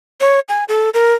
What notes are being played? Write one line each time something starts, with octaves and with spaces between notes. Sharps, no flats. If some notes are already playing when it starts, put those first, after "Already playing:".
C#5
G#5
A4
A#4